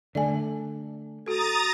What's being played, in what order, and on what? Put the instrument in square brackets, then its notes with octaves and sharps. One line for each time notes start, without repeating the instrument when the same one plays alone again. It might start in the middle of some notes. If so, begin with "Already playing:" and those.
[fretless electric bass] D3 A3 [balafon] D5 G#5
[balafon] F#4 A4 [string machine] A#5 D#6 A6